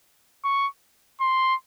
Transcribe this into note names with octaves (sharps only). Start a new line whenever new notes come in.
C#6
C6